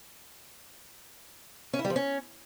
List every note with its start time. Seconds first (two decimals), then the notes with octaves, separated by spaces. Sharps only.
1.73 C#4
1.79 E4
1.85 G3
1.90 F3
1.96 C#4